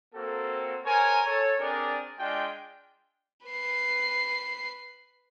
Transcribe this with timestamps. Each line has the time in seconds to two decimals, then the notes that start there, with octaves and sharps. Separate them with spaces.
0.14 A#3 C4 F#4 A4
0.85 G#4 A#4 C5 C#5 G#5
1.26 A4 C#5
1.60 C4 D4 G#4 A#4 D5
2.19 G#3 D4 F4 G5
3.47 B4 C7